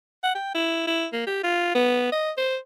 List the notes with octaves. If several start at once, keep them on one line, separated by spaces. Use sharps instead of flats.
F#5
G5
E4
E4
A#3
G4
F4
B3
D#5
C5